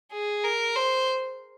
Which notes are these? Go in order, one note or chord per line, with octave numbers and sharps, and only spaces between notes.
G#4
A#4
C5